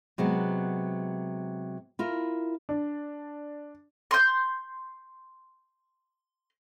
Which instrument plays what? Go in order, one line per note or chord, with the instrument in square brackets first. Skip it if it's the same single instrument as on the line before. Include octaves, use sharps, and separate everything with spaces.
[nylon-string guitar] C3 F#3 G#3 B3
E4 F4 A#4
[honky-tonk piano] D4
[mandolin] C6 G6